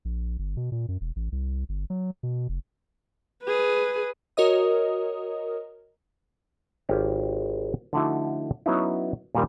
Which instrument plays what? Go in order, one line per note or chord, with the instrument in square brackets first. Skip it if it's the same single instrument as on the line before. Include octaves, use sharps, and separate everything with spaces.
[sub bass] A#1
G1
B2
A#2
F#2
E1
A1
C2
G1
F#3
B2
F1
[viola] G#4 B4
[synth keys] F#4 A#4 C#5 D#5 D#6
[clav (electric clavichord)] G#1 F4 G4 C#5
D3 F3 A3 D#4 E4 F#4
F#3 B3 C#4 D#4 E4
A#2 D#3 G3 A#4 F5